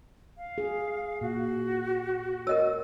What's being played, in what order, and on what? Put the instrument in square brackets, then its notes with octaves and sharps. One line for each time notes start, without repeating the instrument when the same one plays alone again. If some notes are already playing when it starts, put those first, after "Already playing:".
[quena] F5
[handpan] G#4
[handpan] A#2 [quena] F#4
[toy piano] A#4 D#5 E6 [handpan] C#5